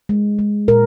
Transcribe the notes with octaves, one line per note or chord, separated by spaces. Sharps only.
G#3
G#3
A#2 A#4